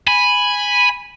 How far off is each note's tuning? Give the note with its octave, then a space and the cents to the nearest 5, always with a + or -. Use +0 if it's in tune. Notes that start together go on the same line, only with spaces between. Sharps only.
G#5 -5 B5 +0